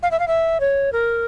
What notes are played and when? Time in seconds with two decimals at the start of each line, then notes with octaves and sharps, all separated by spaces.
0.03 F5
0.11 E5
0.19 F5
0.28 E5
0.60 C#5
0.92 A#4